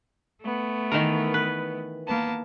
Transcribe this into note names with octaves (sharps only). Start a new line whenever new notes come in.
A3 B3
D#3 E3 A#4
B4
A#3 B3 A5